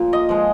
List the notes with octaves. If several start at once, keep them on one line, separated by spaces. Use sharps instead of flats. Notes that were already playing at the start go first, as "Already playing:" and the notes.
Already playing: A#2 F3
D#5
F3 G#3